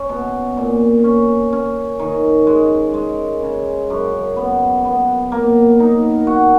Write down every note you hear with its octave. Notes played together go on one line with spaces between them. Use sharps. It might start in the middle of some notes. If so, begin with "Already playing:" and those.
Already playing: C#4
B2
A#2
C#4
C#4
D#3
G#3
G#3
C#3
F#2
B3
B3
A#3
D#4
F#4